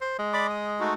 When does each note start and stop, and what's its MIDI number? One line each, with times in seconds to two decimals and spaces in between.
0.01 0.18 72
0.19 0.91 56
0.33 0.47 74
0.33 0.47 83
0.33 0.47 86
0.50 0.70 87
0.80 0.94 57
0.80 0.94 63
0.80 0.94 66